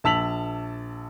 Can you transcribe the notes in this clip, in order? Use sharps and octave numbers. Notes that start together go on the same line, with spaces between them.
A#1 A5 E6 B6 F7 F#7